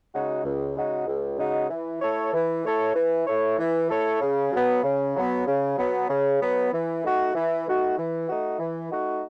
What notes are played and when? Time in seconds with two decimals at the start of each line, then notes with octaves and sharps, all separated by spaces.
0.13 C#3 G#3 D#4 F#4
0.44 C#2
0.75 C#3 G#3 D#4 F#4
1.07 C#2
1.38 C#3 G#3 D#4 F#4
1.69 E3
2.01 A3 E4 A4 C#5
2.33 E3
2.64 A3 E4 A4 C#5
2.95 E3
3.27 A3 E4 A4 C#5
3.58 E3
3.89 A3 E4 A4 C#5
4.21 C#3
4.52 F#3 B3
4.83 C#3
5.15 F#3 B3
5.46 C#3
5.77 F#3 B3
6.09 C#3
6.40 F#3 B3
6.72 E3
7.03 A3 D#4 F#4
7.34 E3
7.66 A3 D#4 F#4
7.97 E3
8.28 A3 D#4 F#4
8.59 E3
8.90 A3 D#4 F#4